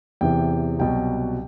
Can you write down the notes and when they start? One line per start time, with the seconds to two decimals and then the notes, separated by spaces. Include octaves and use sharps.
0.21 E2 C3 E3 G5
0.79 C2 B2 F#3 G5